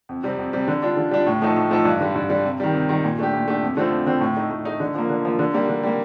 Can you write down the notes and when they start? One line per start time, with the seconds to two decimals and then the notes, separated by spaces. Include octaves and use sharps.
0.09 F2
0.23 C3 G3 C4
0.38 F2
0.53 C3 G3 C4
0.68 D3
0.82 G3 D4 F4
0.97 D3
1.11 G3 D4 F4
1.27 A2
1.42 F3 A3 D#4 A4
1.57 A2
1.71 F3 A3 D#4 A4
1.85 G2
2.01 D3 G3
2.15 G2
2.30 D3 G3
2.45 C3
2.60 D#3 G3
2.74 C3
2.89 D#3 G3
3.04 A#2
3.19 A3 D4 G4
3.33 A#2
3.48 A3 D4 G4
3.63 F2
3.77 D3 A3 C4 F4
3.92 F2
4.06 D3 A3 C4 F4
4.21 A2
4.36 A3 D#4
4.51 A2
4.65 A3 D#4
4.80 D3
4.95 F3 A#3
5.09 D3
5.25 F3 A#3
5.39 D3
5.54 G3 A#3
5.69 D3
5.83 G3 A#3